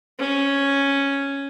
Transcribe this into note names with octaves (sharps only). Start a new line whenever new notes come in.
C#4